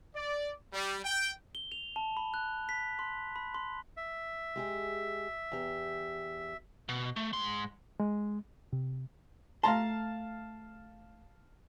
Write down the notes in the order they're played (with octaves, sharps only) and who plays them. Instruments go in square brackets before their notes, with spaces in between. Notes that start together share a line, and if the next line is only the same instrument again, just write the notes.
[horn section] D5
G3
G5
[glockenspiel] G7
F7
A5
B5
F#6
B6
C6
B5
C6
[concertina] E5
[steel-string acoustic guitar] G#3 G4 G#4
E2 G4
[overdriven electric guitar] B2
A3
G#2 C6
[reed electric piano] G#3
[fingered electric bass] C3
[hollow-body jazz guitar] A3 A#5 C6 [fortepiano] F5 A5